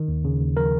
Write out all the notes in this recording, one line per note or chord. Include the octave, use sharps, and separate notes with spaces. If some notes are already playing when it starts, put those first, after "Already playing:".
Already playing: D#3
D#2
C#3
D#2
F3 A#4